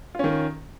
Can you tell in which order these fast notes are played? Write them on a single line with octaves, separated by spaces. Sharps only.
F4 C#4 D#3